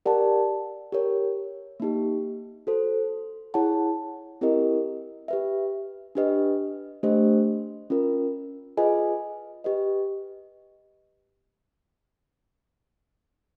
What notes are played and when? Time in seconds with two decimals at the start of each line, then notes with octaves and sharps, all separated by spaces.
0.06 G4 A#4 D5 F#5 A5
0.92 G4 A#4 C#5
1.80 A#3 D#4 G4
2.67 F#4 A4 C5
3.54 E4 G#4 C#5 F#5 A5
4.41 C4 E4 G4 A#4 D#5
5.28 G4 B4 E5
6.15 D4 G4 B4 D#5
7.03 A3 D4 G4 C5 D#5
7.90 C#4 F4 A#4
8.77 F4 G#4 B4 D#5 G#5
9.64 G4 B4 D#5